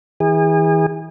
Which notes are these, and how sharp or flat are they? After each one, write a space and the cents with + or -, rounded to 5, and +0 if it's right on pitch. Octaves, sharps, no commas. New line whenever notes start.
E3 -35 G#4 -35